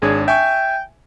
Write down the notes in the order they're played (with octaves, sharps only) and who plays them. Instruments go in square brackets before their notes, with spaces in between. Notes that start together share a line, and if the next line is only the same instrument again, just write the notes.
[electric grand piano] G#1 D4 C#5 [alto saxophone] G#4
[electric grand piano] E5 G#5 C#6 [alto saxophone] G5